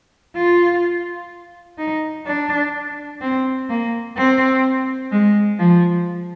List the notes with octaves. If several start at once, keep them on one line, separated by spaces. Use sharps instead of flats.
F4
D#4
D4
C4
A#3
C4
G#3
F3